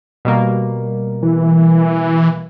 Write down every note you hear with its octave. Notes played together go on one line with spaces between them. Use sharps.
B2 G3 A#3
E3